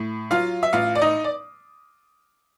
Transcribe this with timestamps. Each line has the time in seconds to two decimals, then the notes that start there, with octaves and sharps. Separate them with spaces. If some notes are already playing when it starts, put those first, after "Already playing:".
Already playing: A2
0.31 F#3 F4 F5
0.63 E5
0.73 A1 F4 F5
0.95 D5
1.01 D#4 D#5
1.24 D5